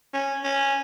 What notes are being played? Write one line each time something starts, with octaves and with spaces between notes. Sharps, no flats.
C#4
C#4